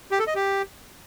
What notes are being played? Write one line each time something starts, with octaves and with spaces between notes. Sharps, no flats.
G4
A4
D#5
G4